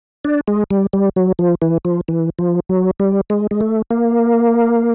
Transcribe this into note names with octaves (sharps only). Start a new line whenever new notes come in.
D4
G#3
G3
G3
F#3
F3
E3
F3
E3
F3
F#3
G3
G#3
G#3
A3
A#3